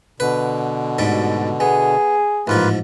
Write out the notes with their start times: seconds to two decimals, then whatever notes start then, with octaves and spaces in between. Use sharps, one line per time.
0.20 B2 D3 B4
0.98 D2 G#2 G3
1.60 B3 G#4
2.47 A1 G#2 F3 A#3 F4 B4